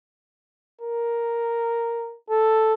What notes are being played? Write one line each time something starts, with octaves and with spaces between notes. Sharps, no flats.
A#4
A4